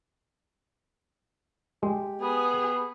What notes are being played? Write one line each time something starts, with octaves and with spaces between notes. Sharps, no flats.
G#3 G4
B3 G#4